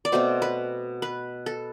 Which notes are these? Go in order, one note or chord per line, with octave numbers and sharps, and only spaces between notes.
D5
B2 A3 C4 C5
B4
B4
A4